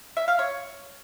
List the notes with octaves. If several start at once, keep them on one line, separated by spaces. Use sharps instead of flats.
E5
F5
C#5